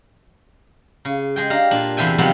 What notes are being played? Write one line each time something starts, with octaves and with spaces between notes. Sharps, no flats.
C#3
G#3 G#4 G5
D4 G4 F5 A#5
A#2 D4
E2 C3 E5 G5 G#5
C3 D#3 F3 F#3 B3 C4